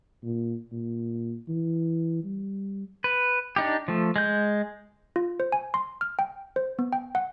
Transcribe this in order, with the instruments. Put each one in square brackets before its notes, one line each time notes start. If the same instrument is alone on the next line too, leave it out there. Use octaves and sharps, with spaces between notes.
[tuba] A#2
A#2
E3
G3
[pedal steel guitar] B4
D4 D#4 G4
F3 A3
G#3 G6
[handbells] F4
C5
G#5
C6
F6
G5
C5
B3
G5
F#5